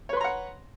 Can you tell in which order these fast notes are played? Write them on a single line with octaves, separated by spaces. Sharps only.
C#5 B4 C6 A#5 F#5